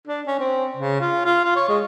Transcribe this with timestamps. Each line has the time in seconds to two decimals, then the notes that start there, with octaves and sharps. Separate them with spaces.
0.07 D4
0.27 C#4
0.40 C4
0.77 C#3
1.01 F4
1.25 F4
1.45 F4
1.56 C#5
1.69 G#3